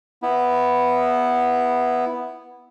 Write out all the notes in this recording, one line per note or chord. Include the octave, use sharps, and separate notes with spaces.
B3 E4